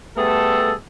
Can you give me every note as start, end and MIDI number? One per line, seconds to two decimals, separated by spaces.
0.17 0.72 55
0.17 0.72 57
0.17 0.72 59
0.17 0.72 68
0.17 0.72 69